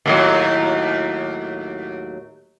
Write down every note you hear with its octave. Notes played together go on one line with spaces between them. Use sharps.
D#2 A2 F#3